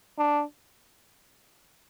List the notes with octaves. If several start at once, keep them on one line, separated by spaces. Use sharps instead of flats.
D4